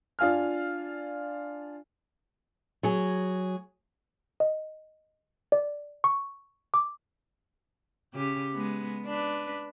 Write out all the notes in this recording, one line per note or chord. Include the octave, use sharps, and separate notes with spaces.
D4 F4 F5 G#5 F6
F#3 G#4
D#5
D5
C#6
D6
C#3 G4
G#3 B3
D4 B4